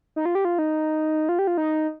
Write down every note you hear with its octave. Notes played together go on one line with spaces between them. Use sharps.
D#4
F4
G4
F4
D#4
F4
G4
F4
D#4